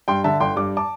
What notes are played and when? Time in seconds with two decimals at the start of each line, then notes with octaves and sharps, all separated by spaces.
0.08 G2 G5 C6
0.24 D3 E5 A5
0.40 G1 G5 C6
0.56 G2 D6
0.77 A5 D6